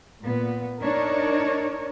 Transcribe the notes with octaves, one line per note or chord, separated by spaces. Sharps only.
A#2 B3
D4 D#4 A#4 C#5